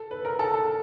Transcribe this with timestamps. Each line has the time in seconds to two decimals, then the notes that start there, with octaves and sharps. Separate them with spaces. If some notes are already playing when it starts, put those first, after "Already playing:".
Already playing: A4
0.11 B4
0.25 A#4
0.39 A4
0.54 A4